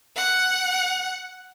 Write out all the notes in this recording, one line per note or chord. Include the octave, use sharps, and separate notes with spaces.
F#5